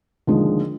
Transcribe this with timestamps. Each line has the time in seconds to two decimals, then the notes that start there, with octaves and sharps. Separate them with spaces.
0.27 D#2 D3 F3 G#3